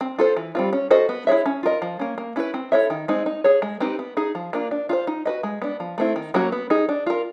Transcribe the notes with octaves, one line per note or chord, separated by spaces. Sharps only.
C4
F4 A4 C5
E3
G3 C4 F4
C#4
F#4 A4 C5 D#5
B3
E4 G#4 C#5 E5
C#4
F4 A#4 D#5
F3
A#3 C#4
A#3
C#4 E4 G#4 B4
C4
E4 A4 C#5 E5
D#3
G#3 C4 D#4
D#4
G#4 C#5
G#3
C4 D#4 G4 B4
B3
D#4 G#4
F3
A#3 D4 F4
D4
F4 G#4 C5
D#4
F#4 B4 D#5
G#3
B3 D4
F3
A3 C4 E4
D#3
F#3 A#3 C#4 F#4
B3
D#4 G#4
D4
F4 A#4